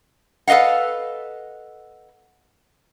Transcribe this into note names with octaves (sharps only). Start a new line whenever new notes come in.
A4 B4 D#5 F5 F#5